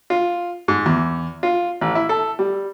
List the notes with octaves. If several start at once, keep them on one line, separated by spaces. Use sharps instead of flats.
F4
G#2
E2
F4
A1
E4
A4
G3